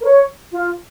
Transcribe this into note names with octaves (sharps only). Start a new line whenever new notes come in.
A#4
C#5
F4